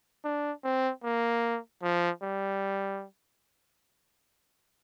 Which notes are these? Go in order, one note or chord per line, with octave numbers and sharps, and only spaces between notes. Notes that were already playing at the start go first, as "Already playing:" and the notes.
D4
C4
A#3
F3
G3